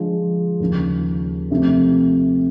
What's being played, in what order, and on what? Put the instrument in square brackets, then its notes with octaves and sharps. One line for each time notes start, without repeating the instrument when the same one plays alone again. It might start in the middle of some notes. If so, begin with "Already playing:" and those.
Already playing: [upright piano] D3 F3 G#3
D#2 C#3 F3
C3 F3 A3